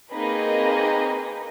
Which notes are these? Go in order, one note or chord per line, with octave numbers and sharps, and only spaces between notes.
A#3 C4 D#4 G#4 B4 D#5